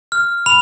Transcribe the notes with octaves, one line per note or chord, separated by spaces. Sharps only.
F6
B5 F7